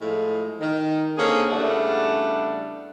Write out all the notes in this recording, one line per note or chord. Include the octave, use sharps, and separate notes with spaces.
A2 F3 G#3
D#3
D3 A#3 C4 C#4 G#4
E2 C#3 G3 A3 D4 F#5